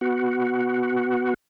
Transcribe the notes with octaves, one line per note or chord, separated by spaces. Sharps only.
B3 F#4